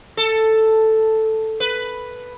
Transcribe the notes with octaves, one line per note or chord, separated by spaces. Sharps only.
A4
B4